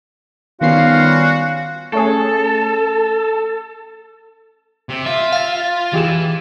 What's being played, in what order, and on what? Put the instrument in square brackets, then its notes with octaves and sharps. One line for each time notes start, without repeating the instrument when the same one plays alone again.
[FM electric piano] D#3 B3 C7 [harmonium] G3 C#4 F4 [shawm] F#4 [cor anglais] F5
[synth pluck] A3 C#4 G#4 [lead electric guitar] A4
[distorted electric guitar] C3
[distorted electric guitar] F4 [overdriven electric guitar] E5
[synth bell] F5 A6
[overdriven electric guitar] E3 [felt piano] G4 G#4 E7